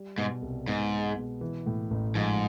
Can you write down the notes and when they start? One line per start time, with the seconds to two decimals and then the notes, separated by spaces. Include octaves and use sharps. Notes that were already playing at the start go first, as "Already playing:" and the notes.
Already playing: G3
0.18 G#2 B2
0.42 C2
0.67 G#2 B3
0.92 G#3
1.16 B2
1.41 E3
1.66 A2
1.91 A1
2.15 G#2 F3